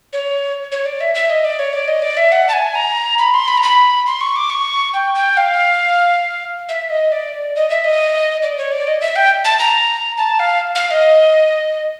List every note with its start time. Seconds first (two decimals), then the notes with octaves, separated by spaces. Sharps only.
0.13 C#5
0.72 C#5
0.86 D5
1.01 E5
1.15 E5
1.30 D#5
1.45 D5
1.59 C#5
1.73 D5
1.88 D#5
2.02 D5
2.17 E5
2.32 F#5
2.48 A5
2.53 G#5
2.75 A#5
3.19 B5
3.34 C6
3.48 B5
3.58 A#5
3.63 B5
4.06 C6
4.21 C#6
4.36 D6
4.50 C#6
4.94 G5
5.15 G5
5.37 F5
6.69 E5
6.90 D#5
7.12 D5
7.55 D#5
7.70 E5
7.84 D#5
8.43 D5
8.57 C#5
8.72 D5
8.87 D#5
9.01 E5
9.16 G5
9.45 A5
9.59 A#5
10.17 A5
10.40 F5
10.75 F5
10.91 D#5